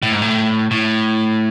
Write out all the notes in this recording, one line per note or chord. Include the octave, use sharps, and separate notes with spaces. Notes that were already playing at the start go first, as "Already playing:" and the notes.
A2
G#2
A2
A2